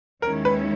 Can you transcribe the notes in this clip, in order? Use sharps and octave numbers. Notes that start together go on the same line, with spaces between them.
D#2 D#3 G#3 C#4 E4 A#4
B4